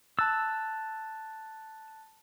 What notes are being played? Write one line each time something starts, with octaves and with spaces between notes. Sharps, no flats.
A5 E6 F#6 A6